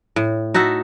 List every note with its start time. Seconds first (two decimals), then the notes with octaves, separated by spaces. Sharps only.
0.16 A2
0.54 D#4 F#4 A4 E5